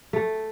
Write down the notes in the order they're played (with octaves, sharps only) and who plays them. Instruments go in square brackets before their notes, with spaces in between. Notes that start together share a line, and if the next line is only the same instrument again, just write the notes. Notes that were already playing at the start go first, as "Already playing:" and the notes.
[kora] A3